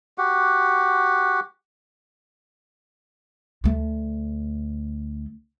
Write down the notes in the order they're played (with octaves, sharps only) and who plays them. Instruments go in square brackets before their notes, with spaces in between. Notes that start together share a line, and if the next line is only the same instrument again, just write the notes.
[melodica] F#4 G4 F#5
[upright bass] D2 A3